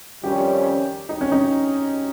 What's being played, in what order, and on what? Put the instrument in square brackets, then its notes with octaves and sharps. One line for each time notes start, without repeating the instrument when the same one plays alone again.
[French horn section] F2 D#3 G3 C#4 [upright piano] G4
[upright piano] D#4
C#4
D#4